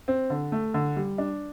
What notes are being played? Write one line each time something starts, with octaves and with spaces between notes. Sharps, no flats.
C4
D3
A3
D3
G3
D4